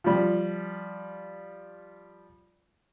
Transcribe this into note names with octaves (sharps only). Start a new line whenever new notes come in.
F3 G3